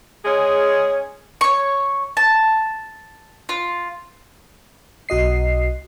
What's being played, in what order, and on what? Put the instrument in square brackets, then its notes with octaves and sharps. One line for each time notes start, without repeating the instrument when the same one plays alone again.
[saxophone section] G#3 C#4 G#4
[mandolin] C#5 C#6
A5
F4
[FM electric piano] B1 F#4 D#5 C7